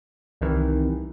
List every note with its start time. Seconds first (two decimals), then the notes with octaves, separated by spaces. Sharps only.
0.41 C2 C3 D#3 E3